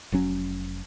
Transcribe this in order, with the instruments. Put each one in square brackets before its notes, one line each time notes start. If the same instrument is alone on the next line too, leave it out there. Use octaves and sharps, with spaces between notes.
[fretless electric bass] F1 F#3 C#4